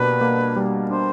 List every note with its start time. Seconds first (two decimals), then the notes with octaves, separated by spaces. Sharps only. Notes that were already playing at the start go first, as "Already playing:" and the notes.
Already playing: B2 G3 A#3 D4 B4
0.21 A#3
0.56 G3
0.90 D4 C5